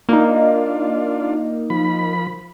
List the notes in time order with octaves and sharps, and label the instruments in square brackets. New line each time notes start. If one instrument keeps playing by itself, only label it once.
[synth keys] A#3 D#4 [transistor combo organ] D4 F4
[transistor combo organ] F3 B5